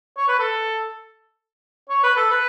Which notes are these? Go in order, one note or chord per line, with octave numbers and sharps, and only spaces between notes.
C#5
B4
A4
C#5
B4
A4
B4